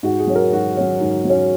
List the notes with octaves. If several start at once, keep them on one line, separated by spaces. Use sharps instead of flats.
G#2 F#4
G#4
F#3 C#4
A#4
G#2 F#4
F#3 C#4
G#2
F#3 C#4